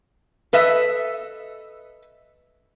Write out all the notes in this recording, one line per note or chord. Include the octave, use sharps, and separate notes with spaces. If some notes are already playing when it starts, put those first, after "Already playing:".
A4 B4 D#5 E5